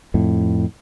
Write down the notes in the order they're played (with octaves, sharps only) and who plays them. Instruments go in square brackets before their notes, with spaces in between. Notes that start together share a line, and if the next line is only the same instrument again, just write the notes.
[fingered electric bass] F2 A2